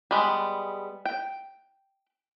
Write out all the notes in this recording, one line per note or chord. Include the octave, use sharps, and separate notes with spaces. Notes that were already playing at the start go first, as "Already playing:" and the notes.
G3 G#3 B3
G5